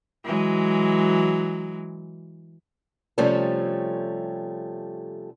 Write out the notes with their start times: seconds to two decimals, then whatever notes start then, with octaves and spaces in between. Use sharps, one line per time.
0.24 E3 F#3 G#3
3.18 C3 F3 G3 A3 C#4 A4